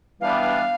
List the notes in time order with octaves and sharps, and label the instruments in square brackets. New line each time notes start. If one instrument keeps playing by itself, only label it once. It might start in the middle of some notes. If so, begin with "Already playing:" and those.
[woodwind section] E3 G3 B3 D4 [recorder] F5